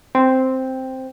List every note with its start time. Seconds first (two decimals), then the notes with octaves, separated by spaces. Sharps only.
0.15 C4